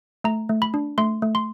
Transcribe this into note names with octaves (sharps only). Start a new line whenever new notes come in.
A3 A#5
A3
B5
D4
A3 C6
A3
C6